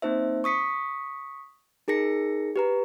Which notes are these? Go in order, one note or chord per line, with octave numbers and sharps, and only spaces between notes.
A#3 C4 D#4 C5 E5
C#6 D#6 B6 C#7
D#4 G#4 A#4 A#6 C#7
G4 B4 A#5